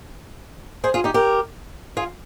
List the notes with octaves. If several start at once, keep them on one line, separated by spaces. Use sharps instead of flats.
G#4 C5
F4 G#4
D#4 G4
G4 A#4
F4 G#4